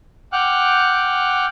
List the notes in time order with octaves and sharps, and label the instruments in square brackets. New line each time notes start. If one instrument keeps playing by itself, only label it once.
[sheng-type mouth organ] F#5 G5 D6 F6 F#6